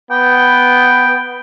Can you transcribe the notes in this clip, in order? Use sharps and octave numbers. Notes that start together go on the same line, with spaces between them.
B3 G5